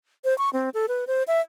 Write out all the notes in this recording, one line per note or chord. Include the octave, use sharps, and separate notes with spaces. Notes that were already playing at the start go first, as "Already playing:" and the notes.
C5
C#6
C4
A4
B4
C5
E5